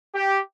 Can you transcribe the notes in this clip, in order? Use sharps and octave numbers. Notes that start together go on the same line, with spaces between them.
G4